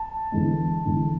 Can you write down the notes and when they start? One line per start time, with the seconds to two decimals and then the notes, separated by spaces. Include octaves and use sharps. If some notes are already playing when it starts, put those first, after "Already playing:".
Already playing: A5
0.32 E2 D3 G#3
0.85 E2 D3 G#3